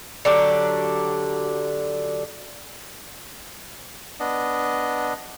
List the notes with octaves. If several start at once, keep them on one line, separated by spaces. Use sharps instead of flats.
D3 F#3 D4 G4
B3 D4 D#5